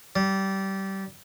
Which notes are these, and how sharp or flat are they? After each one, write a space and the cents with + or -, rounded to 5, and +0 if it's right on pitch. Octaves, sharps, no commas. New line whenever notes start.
G3 -20